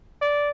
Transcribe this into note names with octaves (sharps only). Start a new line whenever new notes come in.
D5